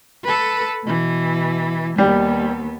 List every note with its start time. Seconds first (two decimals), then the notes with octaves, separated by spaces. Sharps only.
0.24 A4 B4
0.85 B2 E3
1.98 D#2 G3 B3